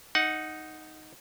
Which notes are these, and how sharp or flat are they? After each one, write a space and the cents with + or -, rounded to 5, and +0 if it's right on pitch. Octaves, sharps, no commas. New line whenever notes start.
D#4 +0 F#5 +0